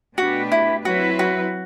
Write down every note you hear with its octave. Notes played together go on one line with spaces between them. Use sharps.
B2 A3 D4 F#4 G4 B4
E4
F#3 C4 E4 F#4 B4
F#4